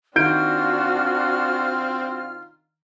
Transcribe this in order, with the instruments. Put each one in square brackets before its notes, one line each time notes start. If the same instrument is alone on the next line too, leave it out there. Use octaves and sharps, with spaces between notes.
[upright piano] D#3 G6 D7 [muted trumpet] C4 [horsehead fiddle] D4 F#4 [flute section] F4 F6